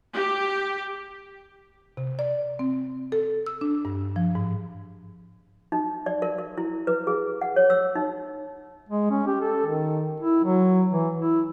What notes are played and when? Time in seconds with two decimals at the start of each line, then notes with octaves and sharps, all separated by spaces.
0.14 G4
1.97 C3
2.19 D5
2.59 C4
3.12 A4
3.46 E6
3.61 D4
3.85 G2
4.16 F3
4.35 G#2
5.72 D#4
6.06 D5
6.22 A#4
6.38 A#4
6.58 E4
6.87 B4
7.07 G#4
7.41 F#5
7.56 C#5
7.70 E6
7.95 D#4
8.89 G#3
9.11 C#4
9.27 G4
9.41 A4
9.66 D#3
10.21 E4
10.44 F#3
10.92 E3
11.18 E4